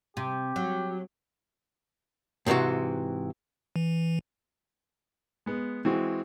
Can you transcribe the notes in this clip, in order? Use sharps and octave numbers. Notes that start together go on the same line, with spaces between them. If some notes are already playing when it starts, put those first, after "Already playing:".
C3 G4
F#3
G#2 C3 D#3 E3 F#4
E3
G#3 B3
E3 G#3 C4 F#4